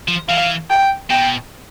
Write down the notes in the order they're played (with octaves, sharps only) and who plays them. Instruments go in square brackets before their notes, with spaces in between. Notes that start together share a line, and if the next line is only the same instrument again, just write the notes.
[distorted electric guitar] F3
[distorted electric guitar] E3 [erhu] F5
[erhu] G5
[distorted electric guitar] B2 [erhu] G5